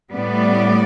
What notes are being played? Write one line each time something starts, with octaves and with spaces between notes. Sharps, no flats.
A2 G3 B3 D5